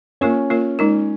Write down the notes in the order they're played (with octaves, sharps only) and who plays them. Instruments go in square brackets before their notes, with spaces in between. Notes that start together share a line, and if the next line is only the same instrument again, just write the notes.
[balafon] A#3 F4 A#4 C#5 [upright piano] C#4
[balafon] A#3 F4 A#4 C#5
G#3 D#4 A#4